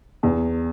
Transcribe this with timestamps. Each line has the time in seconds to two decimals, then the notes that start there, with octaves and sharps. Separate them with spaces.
0.23 E2